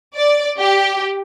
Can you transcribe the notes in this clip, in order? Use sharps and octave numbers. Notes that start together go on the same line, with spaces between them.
D5
G4